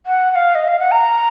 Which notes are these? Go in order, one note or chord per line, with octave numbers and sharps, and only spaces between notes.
F#5
F#5
F5
D#5
F5
F#5
A#5